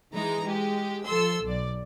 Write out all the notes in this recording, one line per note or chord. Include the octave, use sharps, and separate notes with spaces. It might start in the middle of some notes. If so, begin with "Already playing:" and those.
E3 G#3 D#4 A#5
G#3 G4
F3 A4 C6 E6
B1 D5